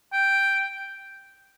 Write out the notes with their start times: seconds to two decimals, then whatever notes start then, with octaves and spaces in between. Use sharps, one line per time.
0.13 G5